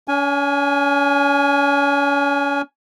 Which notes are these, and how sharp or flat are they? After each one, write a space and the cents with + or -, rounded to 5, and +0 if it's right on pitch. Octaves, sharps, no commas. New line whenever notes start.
C#4 +40 G#5 +0